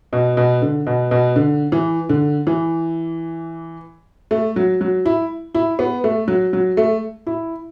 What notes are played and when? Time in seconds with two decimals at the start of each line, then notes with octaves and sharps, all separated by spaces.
0.13 B2
0.37 B2
0.62 D3
0.87 B2
1.11 B2
1.36 D3
1.72 E3
2.09 D3
2.47 E3
4.31 A3
4.56 F#3
4.81 F#3
5.06 E4
5.55 E4
5.79 B3
6.04 A3
6.28 F#3
6.53 F#3
6.77 A3
7.27 E4